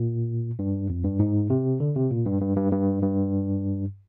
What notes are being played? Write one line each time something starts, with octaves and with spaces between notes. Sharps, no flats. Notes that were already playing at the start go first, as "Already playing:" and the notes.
Already playing: A#2
G2
F2
G2
G#2
C3
D3
C3
A#2
G2
G2
G2
G2
G2